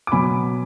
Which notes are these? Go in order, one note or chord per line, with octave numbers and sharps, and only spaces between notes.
D6
B2 F#3 G#5 B5